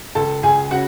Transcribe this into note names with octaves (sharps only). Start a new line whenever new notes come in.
C#2 A4 A5
C#2 G#4 G#5
C#3 F#4 F#5